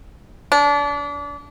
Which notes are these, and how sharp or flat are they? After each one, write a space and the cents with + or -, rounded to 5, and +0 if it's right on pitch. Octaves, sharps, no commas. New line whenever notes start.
D4 -30